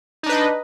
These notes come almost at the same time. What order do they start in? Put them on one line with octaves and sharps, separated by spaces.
D#4 D4 B4 D#5